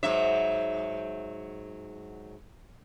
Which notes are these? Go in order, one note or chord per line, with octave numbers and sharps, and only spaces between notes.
G#2 F#3 E5